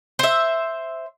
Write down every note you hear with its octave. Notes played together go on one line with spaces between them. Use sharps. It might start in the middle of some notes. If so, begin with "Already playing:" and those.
C5 E5